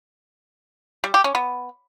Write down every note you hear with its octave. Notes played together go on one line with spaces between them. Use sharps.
G3
G4
C#4
B3